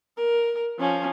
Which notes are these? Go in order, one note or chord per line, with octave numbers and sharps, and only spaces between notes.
A#4
F3 C#4